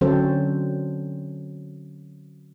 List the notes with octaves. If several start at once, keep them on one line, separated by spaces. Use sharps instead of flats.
D3 F#3 C4 C#4 A4 C5